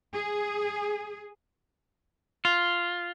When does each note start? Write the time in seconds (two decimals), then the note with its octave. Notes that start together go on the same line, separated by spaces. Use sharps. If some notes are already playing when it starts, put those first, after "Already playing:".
0.15 G#4
2.45 F4